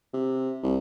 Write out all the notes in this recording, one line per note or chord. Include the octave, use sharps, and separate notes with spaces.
C3
C2